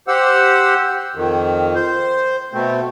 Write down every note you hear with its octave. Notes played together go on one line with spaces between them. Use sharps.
G4 C5 F#5 E6
F2 D#3
C5
B2 A3 C4